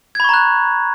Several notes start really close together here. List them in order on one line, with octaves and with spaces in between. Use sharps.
G#6 B5 C#6 A#5 F#6